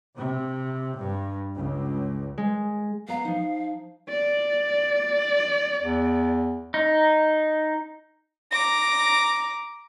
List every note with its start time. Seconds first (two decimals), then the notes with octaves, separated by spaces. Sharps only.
0.15 C3
0.97 G2
1.56 C#2
2.38 G#3
3.08 B3 F5 A#5
3.25 F3 D#4
4.09 D5
5.81 E2
6.74 D#4
8.50 A#5 D6 A#6